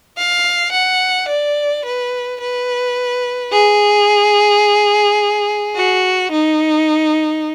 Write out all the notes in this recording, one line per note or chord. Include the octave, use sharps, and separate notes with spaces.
F5
F#5
D5
B4
B4
G#4
F#4
D#4